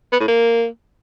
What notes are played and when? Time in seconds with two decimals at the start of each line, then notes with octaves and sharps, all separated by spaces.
0.13 B3
0.20 A2
0.28 A#3